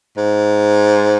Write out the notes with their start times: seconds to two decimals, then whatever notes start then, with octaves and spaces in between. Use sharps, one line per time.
0.17 G#2